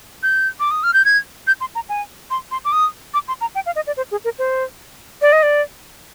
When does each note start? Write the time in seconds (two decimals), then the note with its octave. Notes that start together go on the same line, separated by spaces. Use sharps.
0.23 G6
0.60 D6
0.71 D#6
0.83 F6
0.94 G6
1.05 G#6
1.47 G6
1.61 C6
1.75 A#5
1.89 G#5
2.31 C6
2.51 C6
2.65 D6
2.72 D#6
3.14 D6
3.28 C6
3.41 A#5
3.55 G5
3.66 F5
3.76 D#5
3.87 D5
3.97 C5
4.11 G#4
4.25 A#4
4.39 C5
5.22 D5
5.33 D#5
5.43 D5